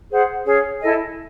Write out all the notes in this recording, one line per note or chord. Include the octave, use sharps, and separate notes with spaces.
G#4 C5 F#5
C#4 G#4 C#5
E4 A4 D#5 G#5